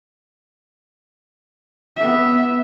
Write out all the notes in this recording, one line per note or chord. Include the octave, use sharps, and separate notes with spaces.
B3 E5